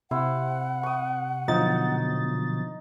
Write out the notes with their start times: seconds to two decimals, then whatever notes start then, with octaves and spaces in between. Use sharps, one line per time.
0.11 C3 E4 C5 F5 F#5
0.83 C#6 D#6
1.48 B2 D3 F3 F#3 D#4 A6